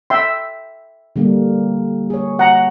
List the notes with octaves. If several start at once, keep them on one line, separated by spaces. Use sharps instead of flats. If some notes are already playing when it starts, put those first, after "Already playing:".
E5 G5 C6
D3 G3 A#3
G#4 C#5
F#5 A#5